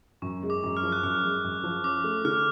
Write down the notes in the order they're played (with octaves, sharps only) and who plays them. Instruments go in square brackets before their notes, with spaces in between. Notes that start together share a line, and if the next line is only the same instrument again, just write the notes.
[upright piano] F#2 [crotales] C#6
[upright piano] G#3
[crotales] D6
[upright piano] F#2
[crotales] F6
[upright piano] F3
[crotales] F#6
[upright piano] F#2 [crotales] F6
[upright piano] G#3
F#2
F3
[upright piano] C#4 [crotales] D6
[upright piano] A3
[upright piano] D3 [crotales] F6